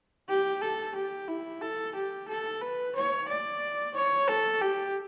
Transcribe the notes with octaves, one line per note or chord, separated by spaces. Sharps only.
G4
A4
G4
E4
A4
G4
A4
B4
C#5
D5
C#5
A4
G4